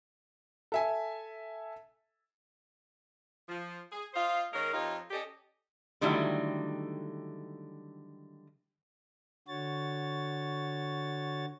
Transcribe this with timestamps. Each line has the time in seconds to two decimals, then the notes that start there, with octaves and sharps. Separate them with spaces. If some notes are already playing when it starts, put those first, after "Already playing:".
0.72 A4 E5 G#5
3.48 F3
3.91 G#4
4.14 F4 C5 D#5 F5
4.53 D#3 G#3 C#4 A#4
4.73 F2 D#4 F4 G4 C#5
5.11 C#4 G4 A4 D5 D#5
6.01 D3 D#3 F#3 G3 A3 E4
9.48 D3 F#4 C#5 A6